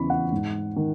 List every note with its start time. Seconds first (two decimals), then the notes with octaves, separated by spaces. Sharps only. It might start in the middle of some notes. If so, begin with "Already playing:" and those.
Already playing: E2 C#3 E3 B5 C#6
0.10 F#5
0.32 G#2
0.76 D#3